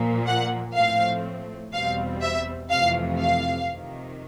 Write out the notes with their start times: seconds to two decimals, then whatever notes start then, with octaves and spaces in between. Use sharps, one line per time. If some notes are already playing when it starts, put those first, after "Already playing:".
Already playing: A#2 F3 A#3
0.26 F#5
0.75 A2 F3 A3 C4 F5
1.73 E2 B2 G3 C4 F5
2.22 E5
2.70 F2 C3 E3 A3 F5
3.19 F5
3.68 F2 C3 D#3